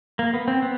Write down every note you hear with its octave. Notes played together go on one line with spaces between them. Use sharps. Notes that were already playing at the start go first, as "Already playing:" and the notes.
A#3
B3
C4
B3